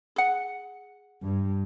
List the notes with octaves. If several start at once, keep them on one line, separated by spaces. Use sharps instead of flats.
G#4 F#5
G2